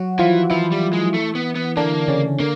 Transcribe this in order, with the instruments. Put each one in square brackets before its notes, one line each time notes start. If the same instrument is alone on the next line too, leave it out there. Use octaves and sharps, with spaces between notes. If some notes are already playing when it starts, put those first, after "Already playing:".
Already playing: [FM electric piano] F#3 F#4
[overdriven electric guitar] E3 [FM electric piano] F3 F4
[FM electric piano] E3 E4 [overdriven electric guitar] F3
[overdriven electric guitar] G3
G#3
A3
B3
B3
[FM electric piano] D3 D4 [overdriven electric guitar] A#3
[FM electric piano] C#3 C#4
[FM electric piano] D3 [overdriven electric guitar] A#3